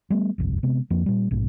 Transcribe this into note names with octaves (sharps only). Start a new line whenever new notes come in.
G3 A3 B3
G1 C2 F2
C3 G#3 B3
F2 F3 A#3 D4
A#2 G3
A#1 G#2 B2